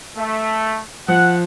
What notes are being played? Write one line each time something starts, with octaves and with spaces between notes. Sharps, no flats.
A3
F3 F#5